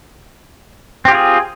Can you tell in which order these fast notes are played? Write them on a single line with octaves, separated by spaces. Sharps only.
C4 G4 F4 G#4